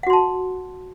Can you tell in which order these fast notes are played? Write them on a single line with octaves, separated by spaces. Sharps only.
F#5 F#4 C6 A5